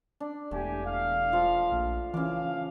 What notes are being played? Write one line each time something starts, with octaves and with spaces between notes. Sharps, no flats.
D4
E1 A3 G4 G#5
F5
F3 F4
A#1
C#3 E3 F5 D6